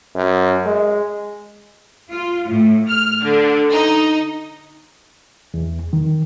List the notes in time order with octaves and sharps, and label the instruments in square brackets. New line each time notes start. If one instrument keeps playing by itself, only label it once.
[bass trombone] F#2
G#3
[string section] F4
A2
F6
D3
D#4
[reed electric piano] E2
D#3